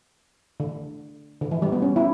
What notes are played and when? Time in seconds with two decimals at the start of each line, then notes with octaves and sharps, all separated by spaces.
0.60 D3
1.42 D3
1.51 E3
1.62 G3
1.72 B3
1.82 C#4
1.96 E4